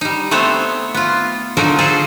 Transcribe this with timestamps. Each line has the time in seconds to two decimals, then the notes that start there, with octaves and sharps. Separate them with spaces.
0.01 G3 D#4
0.31 A3 B3 C4 C5 C#5
0.94 B3 F4
1.57 D3 F3 F#3 D#4 A#4
1.79 F3 G#4 A4 C5